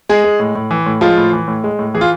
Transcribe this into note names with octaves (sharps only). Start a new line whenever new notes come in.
G#3 G#4
G#3
A2
A2
E3
A2
F3 G#3 F4
A2
E3
A2
G#3
A2
E3 G#4
F4